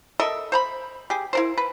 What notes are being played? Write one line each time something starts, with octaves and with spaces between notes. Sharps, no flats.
A4 A#4 D#5 E5
C5 A#5 B5
G4 G#4
E4 A#4 C5
B4